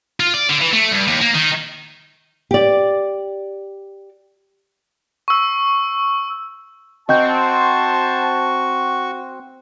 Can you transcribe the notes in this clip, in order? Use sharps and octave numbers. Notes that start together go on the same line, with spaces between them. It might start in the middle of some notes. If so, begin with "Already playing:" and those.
F4
D5
D3
E3
A3
G2
D#2
A#3
D#3
G4 D5
C#6 E6
C4 F#4 C5 D#5 G5 A5 C#6 G6